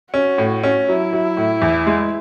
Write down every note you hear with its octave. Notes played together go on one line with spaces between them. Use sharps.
C#4 F#4
A2
C#4
F#3 E4
F#3
A2
E2
G#3